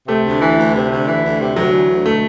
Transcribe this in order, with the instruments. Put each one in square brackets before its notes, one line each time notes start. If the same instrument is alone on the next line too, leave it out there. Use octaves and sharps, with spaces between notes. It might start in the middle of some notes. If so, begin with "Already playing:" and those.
[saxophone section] C3 [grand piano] A3
[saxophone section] D2
E3
D2
C3
D2
E3
D2
C3
[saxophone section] D2 [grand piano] F#3
[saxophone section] E3
D2
[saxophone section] B2 [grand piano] A3